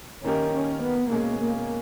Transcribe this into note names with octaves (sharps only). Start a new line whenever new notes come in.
D#3 A#3 C#4 D#4 G4 A#4
C#4
B3
B2 G#3 A#3 C#4 G#4
A#3